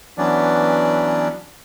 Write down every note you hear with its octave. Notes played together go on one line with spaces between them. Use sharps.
E3 F#3 B3 C#4 D4 D5